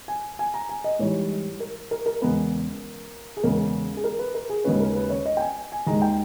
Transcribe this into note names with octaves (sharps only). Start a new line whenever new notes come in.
G#5
G#5
A#5
G#5
D#5
G#2 E3 G3 C#5
A#4
A#4
A#4
E2 C#3 G#3 B3 A#4
G#4
E2 C#3 G#3 B3 A#4
G#4
A#4
B4
A#4
G#4
D#2 C#3 G#3 C#4 B4
A#4
B4
C#5
D#5
G5
G#5
G#5
D#2 D#3 G#3 A#5
G5